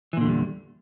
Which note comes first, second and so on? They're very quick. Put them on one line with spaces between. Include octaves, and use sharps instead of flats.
E3 A#2 D3 E2 G3